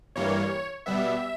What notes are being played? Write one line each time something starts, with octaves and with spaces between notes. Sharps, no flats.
G2 E3 G3 A#3 C#5
B2 G3 B3 E5